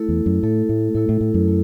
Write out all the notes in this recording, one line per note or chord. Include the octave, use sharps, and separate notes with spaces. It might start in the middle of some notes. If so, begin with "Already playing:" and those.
Already playing: A3 E4 A4
E2
F#2
A2 A3 E4 A4
A2
A2 A3 E4 A4
A2
A2
F#2
A3 E4